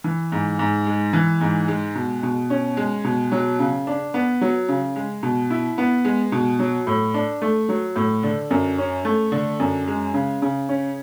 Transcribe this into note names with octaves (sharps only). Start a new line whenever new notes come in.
E3
G#2
G#2
G#3
E3
G#2
G#3
B2
B2
C#4
G#3
B2
F#3
C#3
D4
B3
F#3
C#3
G#3
B2
E4
B3
G#3
B2
F#3
A2
D4
A3
F#3
A2
D3
F#2
C#4
A3
D3
F#2
G#3
C#3
C#3
C#4